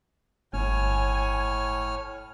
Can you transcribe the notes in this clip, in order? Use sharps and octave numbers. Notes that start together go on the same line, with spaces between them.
G1 A2 C#5 G#5 F6